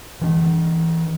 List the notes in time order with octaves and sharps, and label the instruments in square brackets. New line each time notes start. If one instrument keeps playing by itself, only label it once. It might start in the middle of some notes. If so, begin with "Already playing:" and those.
[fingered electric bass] E3 D4